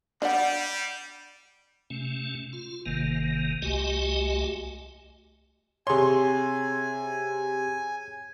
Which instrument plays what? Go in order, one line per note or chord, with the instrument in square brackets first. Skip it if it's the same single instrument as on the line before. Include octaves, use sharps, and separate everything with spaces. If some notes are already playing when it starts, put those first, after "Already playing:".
[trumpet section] G3 [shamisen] D4 D5 F#5
[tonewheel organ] C3 A3 C#4
F4
G#1 C3 D#3 A#3
C2 A3 F#4 G4 D#5 G#5
[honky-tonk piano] C3 C6 [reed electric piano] G#4 C#5 [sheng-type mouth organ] G#5